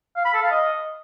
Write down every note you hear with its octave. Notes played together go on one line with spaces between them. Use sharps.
F5
B5
A4
F5
D#5